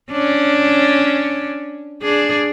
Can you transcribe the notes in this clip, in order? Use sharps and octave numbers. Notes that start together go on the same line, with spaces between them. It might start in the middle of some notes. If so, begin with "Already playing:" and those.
C#4 D4
D4 G#4